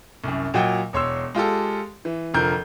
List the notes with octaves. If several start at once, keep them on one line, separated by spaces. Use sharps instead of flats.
C2 F#2
A#2 F#3 D#5 F#5 G5
E1 C#5 C6 E6
G#3 F4 G4 A4
E3
F1 D3 F3 A#4 G6